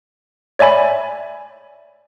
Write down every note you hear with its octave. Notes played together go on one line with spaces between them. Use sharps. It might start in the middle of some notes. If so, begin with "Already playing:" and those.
C#5 D5 E5 G#5 B5